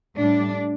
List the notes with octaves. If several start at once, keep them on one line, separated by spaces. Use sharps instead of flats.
A2 G3 D4